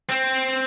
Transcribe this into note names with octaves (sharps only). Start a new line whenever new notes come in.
C4